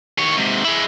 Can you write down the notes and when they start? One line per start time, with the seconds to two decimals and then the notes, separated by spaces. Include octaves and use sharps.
0.19 D#3 C#5
0.37 G#2 C3
0.65 G#3 E4